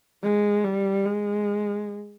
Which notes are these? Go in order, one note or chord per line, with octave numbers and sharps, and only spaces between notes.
G#3
G3
G#3